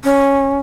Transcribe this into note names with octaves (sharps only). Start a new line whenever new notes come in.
C#4